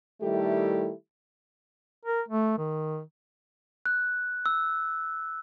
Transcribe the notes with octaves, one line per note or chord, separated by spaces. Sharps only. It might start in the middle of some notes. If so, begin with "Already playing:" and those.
D#3 G3 A3 E4 G4 A4
A#4
A3
D#3
F#6
E6